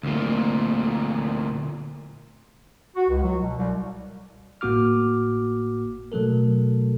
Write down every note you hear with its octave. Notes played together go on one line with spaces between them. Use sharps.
D2 A#2
F#4
C#2
F#3
B2
C2
G#1 A2 A#3 F#4 D6 F6
B2 F#3 A3 A4 A#4